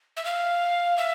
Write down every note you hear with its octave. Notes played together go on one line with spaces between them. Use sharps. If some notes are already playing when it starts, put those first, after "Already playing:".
E5
F5
E5